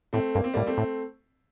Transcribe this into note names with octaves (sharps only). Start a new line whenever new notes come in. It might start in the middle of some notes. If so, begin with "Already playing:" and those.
A2 A3 C4
G2 A#3
C4
A2 G3 A#3
A3 C4
A2